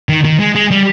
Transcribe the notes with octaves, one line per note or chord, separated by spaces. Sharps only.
D#3
D#3
G#3
G#3
G3